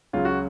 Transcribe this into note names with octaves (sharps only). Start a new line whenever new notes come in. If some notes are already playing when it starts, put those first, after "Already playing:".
C#2 C#3 F#3 F4
F#4